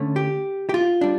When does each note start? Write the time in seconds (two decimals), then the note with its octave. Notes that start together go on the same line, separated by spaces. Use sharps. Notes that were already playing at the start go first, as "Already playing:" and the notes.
Already playing: D3 A3 C#4
0.16 G4
0.69 G4
0.74 F4
1.01 G3 D4